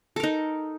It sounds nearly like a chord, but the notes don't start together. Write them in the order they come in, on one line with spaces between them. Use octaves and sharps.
A4 A#4 D#4